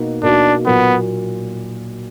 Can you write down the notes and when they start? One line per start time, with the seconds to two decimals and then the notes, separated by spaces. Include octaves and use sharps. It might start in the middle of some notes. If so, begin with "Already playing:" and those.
Already playing: B2 A#3 D#4 F#4
0.23 B2 A#3 D4 D#4 F#4
0.66 A#2 F#3 A#3 B3